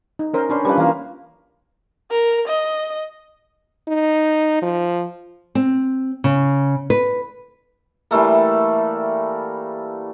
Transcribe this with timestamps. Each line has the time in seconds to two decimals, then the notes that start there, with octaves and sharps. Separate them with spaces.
0.19 D#4
0.34 C#4 A#4 C5
0.50 C#4 D4 B4 C5
0.65 F3 G3 D4 B4
0.78 E3 A#3 F4
2.11 A#4
2.48 D#5
3.88 D#4
4.62 F3
5.55 C4
6.24 C#3
6.90 B4
8.11 E3 G3 A3 A#3